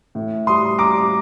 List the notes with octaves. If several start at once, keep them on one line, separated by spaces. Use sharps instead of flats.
A2
G3 C6 D#6
G3 A#5 D6